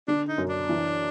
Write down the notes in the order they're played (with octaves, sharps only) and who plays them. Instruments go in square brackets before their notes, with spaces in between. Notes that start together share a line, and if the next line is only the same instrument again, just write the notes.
[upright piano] D3 [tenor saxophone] D4
[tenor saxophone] D#4
[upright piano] F#2
[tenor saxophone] D4
[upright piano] E3